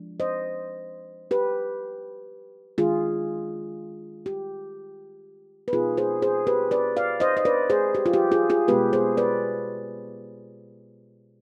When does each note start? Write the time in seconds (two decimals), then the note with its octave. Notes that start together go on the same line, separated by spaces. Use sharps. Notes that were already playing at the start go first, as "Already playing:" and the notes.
Already playing: F3 G#3 D4
0.20 C5 D#5
1.31 G4 B4
2.78 D#3 G#3 D4 F4 G#4
4.26 G4
5.68 B4
5.73 B2 B3 D#4 F4 G#4
5.97 G#4 C5
6.22 G#4 C5
6.47 G4 B4
6.71 B4 D5
6.97 D5 F5
7.20 C5 D#5
7.37 D#5
7.45 B4 D5
7.70 G#4 C5
7.95 G4
8.06 F4
8.13 G4
8.32 F4 G#4
8.50 F4 G#4
8.68 B2 G#3 B3 G4 B4
8.93 G#4 C5
9.17 B4 D5